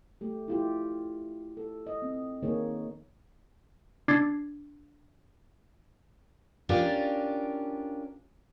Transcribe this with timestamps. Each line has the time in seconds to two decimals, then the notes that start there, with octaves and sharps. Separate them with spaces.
0.21 A3 G4
0.48 E4 F4 G4
1.57 A4
1.87 D#5
2.02 C4
2.43 D#3 A#3 D#4 G#4 C#5
4.08 D4 D6 G#6 A6 C7
6.69 C#4 D4 F4 G4 A#4 D5